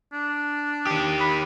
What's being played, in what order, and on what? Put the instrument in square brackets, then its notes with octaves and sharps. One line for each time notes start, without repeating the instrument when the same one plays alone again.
[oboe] D4
[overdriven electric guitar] D#3 G4
[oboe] B5